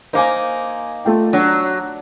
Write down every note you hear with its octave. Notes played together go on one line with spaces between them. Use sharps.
A#3 D#4 C5 G#5
A3 F4 G5
F#3 D4